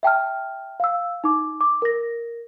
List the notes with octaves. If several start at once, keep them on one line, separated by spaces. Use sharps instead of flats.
E5 G5 A5 F6
F5 E6
D#4 D6
D6
A#4 A#6